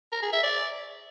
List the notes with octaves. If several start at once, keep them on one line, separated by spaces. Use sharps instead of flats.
A#4
G#4
E5
D5